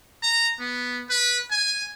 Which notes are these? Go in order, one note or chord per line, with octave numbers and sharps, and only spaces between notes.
A#5
B3
B4
G#5